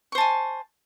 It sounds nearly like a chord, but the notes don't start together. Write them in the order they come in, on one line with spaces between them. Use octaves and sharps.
C#6 C5 A5 G#5